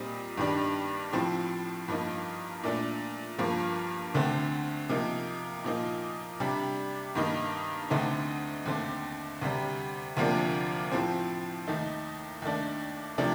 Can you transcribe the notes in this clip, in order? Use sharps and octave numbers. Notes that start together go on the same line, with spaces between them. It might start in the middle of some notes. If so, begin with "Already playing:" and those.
Already playing: A#2 G3 C4 D#4
G2 D#3 G3 D4
A2 F3 C4
G2 F3 A#3 D#4
A#2 A3 D4
G2 F3 A#3
D2 D3 A3 C4
C3 F3 A#3 D#4
A#2 F3 A#3 D#4
C3 G3 D4
G2 D#3 A#3 D#4
D2 D3 A3 C4 D#4
D#2 D3 A3 C4
D2 C3 G3
D2 C3 F3 A#3 D4
A2 F3 C4
D#2 D#3 A3 D#4
D#2 D#3 A3 D4
C3 F3 A3 D4